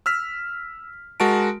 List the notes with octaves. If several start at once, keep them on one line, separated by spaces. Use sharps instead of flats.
E6 F6 B6
G#3 F#4 A#4 A5 D7